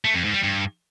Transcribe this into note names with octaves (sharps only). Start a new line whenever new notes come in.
A3
F2
G#2
G3
G2